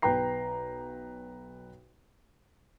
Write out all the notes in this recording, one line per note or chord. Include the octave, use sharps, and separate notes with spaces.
B1 B4 G5 A#5 C7